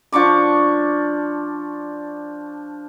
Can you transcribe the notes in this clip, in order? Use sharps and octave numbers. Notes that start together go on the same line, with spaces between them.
F3 D4 C#6 D6